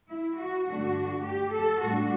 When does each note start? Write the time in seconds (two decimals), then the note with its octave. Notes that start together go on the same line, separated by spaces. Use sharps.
0.09 E4
0.37 F#4
0.66 G2 D3 A3 D4 F#4
1.24 G4
1.52 A4
1.81 A2 G3 D4 F#4